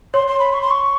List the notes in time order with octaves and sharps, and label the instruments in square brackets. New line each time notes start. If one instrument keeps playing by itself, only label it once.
[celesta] C#5 [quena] C6
[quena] C6
B5
C#6
C6
C#6